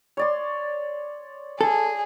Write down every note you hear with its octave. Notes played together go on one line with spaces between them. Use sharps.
C#5 D5 C6
G#4 A4